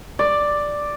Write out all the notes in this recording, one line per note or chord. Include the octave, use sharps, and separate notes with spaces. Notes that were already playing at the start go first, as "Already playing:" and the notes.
D5